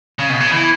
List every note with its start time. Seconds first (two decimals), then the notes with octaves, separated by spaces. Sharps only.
0.19 C#3
0.30 B2
0.40 C#3
0.52 E3